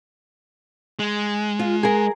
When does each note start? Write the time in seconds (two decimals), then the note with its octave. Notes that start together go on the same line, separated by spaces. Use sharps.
0.99 G#3
1.59 F4
1.83 G#4 A#4